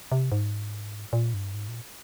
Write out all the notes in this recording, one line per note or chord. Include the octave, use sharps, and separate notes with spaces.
C3
G#2
A#2
G2
G#2
A#2